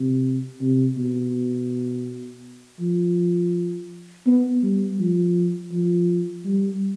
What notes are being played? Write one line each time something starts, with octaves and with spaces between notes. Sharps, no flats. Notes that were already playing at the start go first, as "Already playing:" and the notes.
Already playing: C3
C3
B2
F3
B3
G3
F3
F3
G3